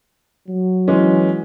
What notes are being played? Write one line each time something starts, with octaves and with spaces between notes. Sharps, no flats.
F#3
E3 G#3 C#4